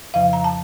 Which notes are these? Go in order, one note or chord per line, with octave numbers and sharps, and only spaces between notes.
F2 C#3 F3 F5
A#5
A5